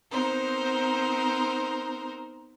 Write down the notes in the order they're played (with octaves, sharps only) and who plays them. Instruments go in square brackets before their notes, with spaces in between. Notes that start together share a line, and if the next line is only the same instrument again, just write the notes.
[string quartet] B3 C4 D#4 A#4 C5